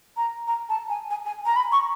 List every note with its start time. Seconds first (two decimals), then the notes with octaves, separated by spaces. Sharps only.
0.17 A#5
0.47 A#5
0.69 A5
0.90 G#5
1.10 G#5
1.26 G#5
1.46 A#5
1.56 B5
1.72 C#6